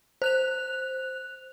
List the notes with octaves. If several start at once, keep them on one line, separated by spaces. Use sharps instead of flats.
C5 F#6 F7